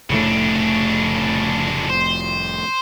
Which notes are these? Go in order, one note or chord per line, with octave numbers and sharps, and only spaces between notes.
F1 A2 C#3 A3 D4
C5